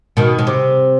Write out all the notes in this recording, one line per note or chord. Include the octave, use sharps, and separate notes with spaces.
B2 D#3
B2
C3